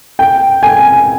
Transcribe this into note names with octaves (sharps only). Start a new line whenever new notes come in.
G5
G#5